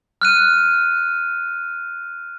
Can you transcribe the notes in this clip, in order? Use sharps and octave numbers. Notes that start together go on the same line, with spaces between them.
F6 F#6 D#7